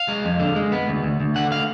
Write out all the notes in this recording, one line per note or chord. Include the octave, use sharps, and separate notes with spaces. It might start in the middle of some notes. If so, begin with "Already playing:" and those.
Already playing: F5
G#3
F2
D3
G#3
B3
D2
D2
D2
D3 F#5
F5